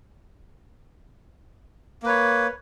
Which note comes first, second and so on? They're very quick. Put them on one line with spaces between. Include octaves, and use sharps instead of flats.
A#3 B4 C#5